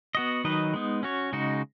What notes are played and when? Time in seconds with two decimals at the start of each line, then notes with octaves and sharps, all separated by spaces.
0.15 B3 F#4 D#5
0.44 D#3 F#3 D#4 B4 D#5
0.73 G#3 B3 D#4
1.03 C#4 F#4 C#5
1.33 C#3 G#3 D#4 F#4